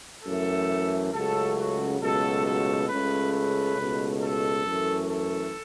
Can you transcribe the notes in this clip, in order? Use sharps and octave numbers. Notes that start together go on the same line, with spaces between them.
F#2 E3 A3 A4
C#2 C#3 F#3 A3 A4
F#4
C#2 B2 F#3 A3 A4
A4
C#2 C#3 A3 B4
B4
C#2 B2 A3
A4
F#2 E3 A3
A4